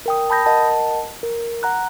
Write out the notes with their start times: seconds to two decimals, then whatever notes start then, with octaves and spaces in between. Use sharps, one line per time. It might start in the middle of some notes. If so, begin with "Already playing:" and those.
0.06 A#4 G5 D#6
0.30 A5 B5 D#6 G6 A#6
0.46 A#4 D#5 F#5 A5
1.23 A#4
1.63 F#5 A#5 F#6